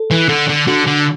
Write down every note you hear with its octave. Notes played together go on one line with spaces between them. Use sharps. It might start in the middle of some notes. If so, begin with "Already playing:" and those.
Already playing: A4
E3
D3
D3
D3 F#4
D3